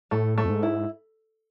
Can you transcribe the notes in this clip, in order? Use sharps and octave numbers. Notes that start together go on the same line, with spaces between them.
A2 A3
A3
F2
G#2
E4